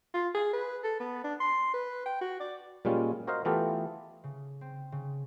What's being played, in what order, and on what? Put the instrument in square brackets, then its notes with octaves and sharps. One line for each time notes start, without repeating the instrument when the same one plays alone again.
[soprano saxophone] F4
G#4
B4
A4
B3
D4
C6
B4
G5
F#4
D5
[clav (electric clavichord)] A#2 G3 G#3 C#4 F4
F#4 A#4 C5 D#5 F5
E3 A3 B3 F4 G4 A4
[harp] C#3
C4
C#3